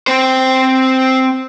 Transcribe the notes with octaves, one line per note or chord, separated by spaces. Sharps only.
C4 C5